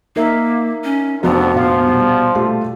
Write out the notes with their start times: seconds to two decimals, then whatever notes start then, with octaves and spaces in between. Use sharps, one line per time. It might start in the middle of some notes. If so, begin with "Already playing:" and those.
0.16 A#3 D#4 A#4 E5
0.84 C#4
1.23 F1 F2 B3 D4 F#4
1.55 A#2 F3 F5
1.87 B2 G3
2.35 A3 F4 G4